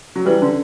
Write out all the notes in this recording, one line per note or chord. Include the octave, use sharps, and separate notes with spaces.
F#3
E3 G3
D3